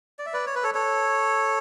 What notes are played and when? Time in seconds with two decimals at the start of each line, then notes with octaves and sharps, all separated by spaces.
0.19 D5
0.26 E5
0.33 B4 D5
0.47 C#5
0.56 B4
0.63 A4 C#5
0.75 A4 C#5